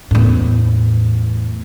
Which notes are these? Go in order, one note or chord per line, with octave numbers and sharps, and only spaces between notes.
E2 A2